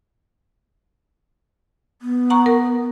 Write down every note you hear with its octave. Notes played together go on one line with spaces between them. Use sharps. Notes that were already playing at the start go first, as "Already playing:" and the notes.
B3
F#5 A#5 C#6
A#4